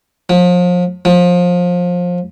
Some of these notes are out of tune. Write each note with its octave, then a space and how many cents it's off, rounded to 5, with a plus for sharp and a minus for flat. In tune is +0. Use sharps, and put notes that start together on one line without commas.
F3 +35
F3 +25